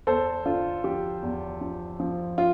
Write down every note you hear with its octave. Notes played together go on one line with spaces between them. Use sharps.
E2 A4 C5
D3 F4
F3 G4
E2
F3
F3
F4